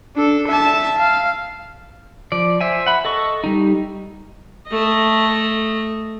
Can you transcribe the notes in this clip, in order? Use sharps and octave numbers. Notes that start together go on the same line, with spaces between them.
D4 A4
E5 A5
F5
F3 D5
C5 E5 G#5
F#5 B5
A4 D#5 C#6
G3 D#4
A3 D#5